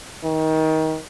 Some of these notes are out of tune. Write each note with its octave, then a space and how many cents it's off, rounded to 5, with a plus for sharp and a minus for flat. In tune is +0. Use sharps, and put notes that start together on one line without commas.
D#3 +25